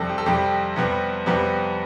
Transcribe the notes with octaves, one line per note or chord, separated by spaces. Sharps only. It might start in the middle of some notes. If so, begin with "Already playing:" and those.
Already playing: F2 C3 G3 A4
G4
A4
F2 C3 G3 G4
F2 C3 G3 B3
F2 C3 G3 B3